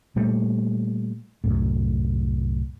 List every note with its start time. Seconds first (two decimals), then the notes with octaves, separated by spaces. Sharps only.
0.16 A#2 G3 A3
1.44 C2 F#2 A2